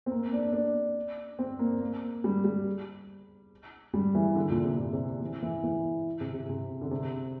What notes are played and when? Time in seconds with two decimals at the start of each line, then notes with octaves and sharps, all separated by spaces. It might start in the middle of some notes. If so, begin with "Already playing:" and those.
0.06 C4
0.11 A#3
0.33 D4
0.53 D4
1.39 C4
1.59 A#3
1.80 A#3
2.24 G3
2.44 G3
3.93 G3
4.15 E3
4.35 D3
4.50 A#2
4.64 C3
4.79 A#2
4.93 C3
5.21 E3
5.42 E3
5.64 E3
6.20 C3
6.34 C3
6.49 C3
6.81 D3
6.91 C3